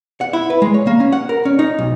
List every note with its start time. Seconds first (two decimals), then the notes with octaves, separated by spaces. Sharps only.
0.21 F#5
0.33 E4
0.50 B4
0.62 G#3
0.74 C#5
0.87 A#3
1.00 C#4
1.12 F#5
1.29 A#4
1.45 C#4
1.59 D#4
1.79 B1